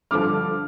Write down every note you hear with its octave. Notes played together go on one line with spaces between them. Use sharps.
G2 D3 F3 D6 F6